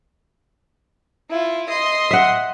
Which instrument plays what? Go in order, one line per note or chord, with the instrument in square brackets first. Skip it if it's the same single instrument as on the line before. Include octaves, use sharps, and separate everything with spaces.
[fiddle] E4 F4
D#5 C6
[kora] E5 F#5